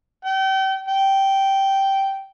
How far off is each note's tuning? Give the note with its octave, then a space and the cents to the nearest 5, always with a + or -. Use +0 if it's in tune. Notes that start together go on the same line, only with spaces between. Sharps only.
G5 -35
G5 -10